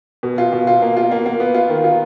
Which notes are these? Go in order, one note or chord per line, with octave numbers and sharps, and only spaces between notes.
B2
F4
B2
F4
A#3
F4
A#3
A#3
B3
F4
D#3
F4